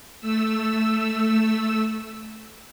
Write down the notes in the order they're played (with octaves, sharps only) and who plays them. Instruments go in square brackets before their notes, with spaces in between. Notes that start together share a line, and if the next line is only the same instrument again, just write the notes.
[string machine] A3 E6